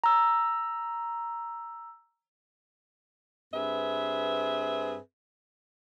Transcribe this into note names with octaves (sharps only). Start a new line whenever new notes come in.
A#5 E6
G2 C4 G#4 B4 E5